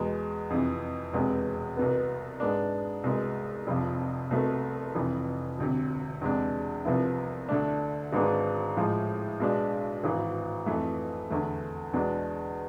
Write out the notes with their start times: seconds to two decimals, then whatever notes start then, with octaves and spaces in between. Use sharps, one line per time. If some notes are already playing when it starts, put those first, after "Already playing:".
Already playing: E2 B2 G#3
0.50 F2 C3 E3
1.13 E1 E2 C3 G#3 B3
1.77 C2 B2 B3
2.40 G#2 G#3 B3 D4
3.04 C2 B2 G#3
3.67 F1 F2 C3 F3
4.31 C2 B2 A3 C4
4.95 F1 F2 E3
5.58 E1 D2 C3
6.21 E2 C3 G#3 D4
6.85 C2 C3 F3 B3 E4
7.49 D2 D3 A3 D4
8.13 G#1 G#2 G#3 B3 D4
8.77 A2 F3 G#3
9.40 B1 B2 G#3 D4
10.03 G#1 G#2 E3
10.66 F2 E3 A3
11.30 E2 D3 A3
11.93 E2 B2 G#3 D4